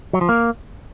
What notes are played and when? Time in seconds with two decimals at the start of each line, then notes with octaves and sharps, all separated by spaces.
0.13 F#3
0.21 F3
0.29 A#3